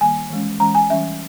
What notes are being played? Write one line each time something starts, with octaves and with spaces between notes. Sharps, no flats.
D#3 G3 A#3 G#5
E3 G#3 C#4
E3 G#3 C#4 A#5
G#5
E3 G3 C#4 E5